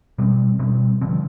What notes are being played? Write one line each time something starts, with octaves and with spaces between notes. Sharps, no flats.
B2 G3 C4
B2 G3 C4
D3 F3 C4